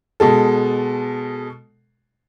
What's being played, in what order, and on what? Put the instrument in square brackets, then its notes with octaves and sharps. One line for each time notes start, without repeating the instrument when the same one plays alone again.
[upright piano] B2 G#3 A4